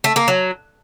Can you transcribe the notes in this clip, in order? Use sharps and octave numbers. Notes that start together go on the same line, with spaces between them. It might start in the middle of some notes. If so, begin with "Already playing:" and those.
A3
A#3
F#3